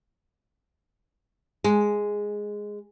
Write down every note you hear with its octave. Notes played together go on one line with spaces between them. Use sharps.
G#3